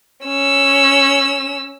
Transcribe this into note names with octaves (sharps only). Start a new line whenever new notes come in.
C#4 E6